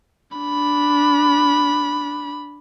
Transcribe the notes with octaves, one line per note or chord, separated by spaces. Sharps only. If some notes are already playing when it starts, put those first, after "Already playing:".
D4 B5